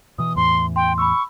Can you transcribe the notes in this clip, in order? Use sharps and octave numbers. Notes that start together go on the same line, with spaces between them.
B2 E3 D#6
E2 A2 E3 C6
G5 C6
B5 C#6 E6